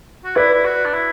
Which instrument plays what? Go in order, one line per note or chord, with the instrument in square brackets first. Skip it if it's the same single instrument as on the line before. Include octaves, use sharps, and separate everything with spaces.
[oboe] F#4
[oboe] E4 [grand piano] B4 D5
[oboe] E4
F#4
D4
E4